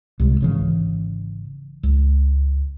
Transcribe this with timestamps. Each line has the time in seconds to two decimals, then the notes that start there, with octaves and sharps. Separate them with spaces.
0.20 C2 C3 G#3
0.41 G#1 C#3 E3
1.83 C#2